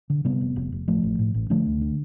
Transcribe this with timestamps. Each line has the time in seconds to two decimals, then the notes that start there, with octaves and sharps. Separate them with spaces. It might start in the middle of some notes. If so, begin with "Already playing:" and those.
0.10 D3
0.25 C3 G3 B3
0.41 F1
0.56 F1
0.72 F1
0.88 A1 F3 A3
1.03 A1
1.19 A2
1.34 A1
1.50 D3 F3 A3
1.66 D2
1.81 D3